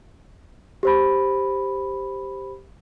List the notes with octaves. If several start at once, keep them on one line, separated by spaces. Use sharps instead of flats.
G4 C5 B5